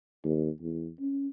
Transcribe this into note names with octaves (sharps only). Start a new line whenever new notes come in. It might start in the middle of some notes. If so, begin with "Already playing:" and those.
D#2
E2
C#4